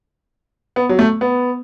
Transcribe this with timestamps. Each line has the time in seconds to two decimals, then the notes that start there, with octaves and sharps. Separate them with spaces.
0.76 B3
0.89 F#3
0.99 A3
1.21 B3